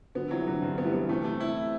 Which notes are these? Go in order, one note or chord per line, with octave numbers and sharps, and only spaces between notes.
D3 F#3 B3
C3 E3 F#3
E3
D3 F#3
G2
B3
E3 G3
B3
C3 E3 A3
A3
E4